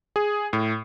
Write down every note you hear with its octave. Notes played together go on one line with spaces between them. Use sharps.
G#4
A2